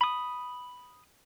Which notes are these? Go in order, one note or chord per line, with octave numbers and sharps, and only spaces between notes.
B5 D#6